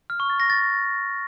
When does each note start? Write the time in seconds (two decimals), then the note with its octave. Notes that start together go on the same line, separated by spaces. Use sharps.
0.10 F6
0.20 C#6
0.30 A6
0.40 A#6
0.50 A6